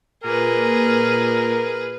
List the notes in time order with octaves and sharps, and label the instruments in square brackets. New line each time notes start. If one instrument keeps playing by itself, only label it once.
[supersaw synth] A#2 [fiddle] G#4 B4 [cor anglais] A#4